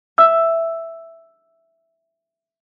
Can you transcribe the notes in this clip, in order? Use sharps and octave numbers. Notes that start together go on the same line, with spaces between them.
E5 E6